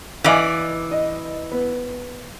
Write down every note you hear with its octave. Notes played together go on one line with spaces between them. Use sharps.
E3 D5 D#5 F5 G#5
D#5
B3